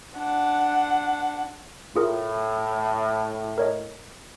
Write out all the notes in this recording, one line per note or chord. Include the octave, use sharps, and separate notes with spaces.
D4 F#5
A2 F4 G#4 A#4
A#4 C#5 D#5